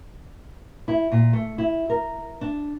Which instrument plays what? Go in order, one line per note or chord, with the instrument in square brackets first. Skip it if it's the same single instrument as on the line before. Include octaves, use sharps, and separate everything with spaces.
[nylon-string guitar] E4
A#2
A3
E4
A#4
D4